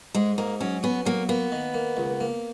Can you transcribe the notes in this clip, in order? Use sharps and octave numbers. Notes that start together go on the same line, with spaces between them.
G#2 G#3
G#2 A#3
F#3 C#4
B3 C#4
F#3 A#3
A#3 B3
D#3
A#3
C#2
A#3